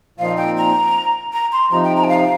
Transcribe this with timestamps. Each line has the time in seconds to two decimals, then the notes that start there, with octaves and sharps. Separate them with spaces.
0.18 A#2 F3 C4 D#4 F5
0.37 G5
0.57 A#5
1.32 A#5
1.52 C6
1.71 C3 F3 D#4 A#5
1.84 G5
1.96 A#5
2.03 G5
2.08 F5